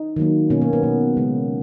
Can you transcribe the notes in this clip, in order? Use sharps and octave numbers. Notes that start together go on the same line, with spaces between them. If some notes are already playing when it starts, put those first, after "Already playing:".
Already playing: D#4
D#3 F#3 A#3
B2 A#3 C#4
A#3
B3
B2 A#3
C#3 G#3